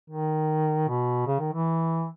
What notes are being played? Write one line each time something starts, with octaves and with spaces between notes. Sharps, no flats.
D#3
B2
C#3
D#3
E3